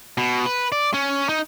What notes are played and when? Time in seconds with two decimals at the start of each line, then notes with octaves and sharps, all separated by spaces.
0.18 B2
0.46 B4
0.72 D5
0.94 C#4
1.29 D#4